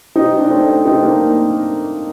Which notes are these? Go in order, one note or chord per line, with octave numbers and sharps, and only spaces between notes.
C4 D#4
D4
A3 C4
C4 D#4
A#3 D4